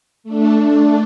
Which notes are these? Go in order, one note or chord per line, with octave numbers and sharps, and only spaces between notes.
A3 D4